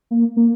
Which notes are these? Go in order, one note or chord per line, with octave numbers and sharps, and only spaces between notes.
A#3
A#3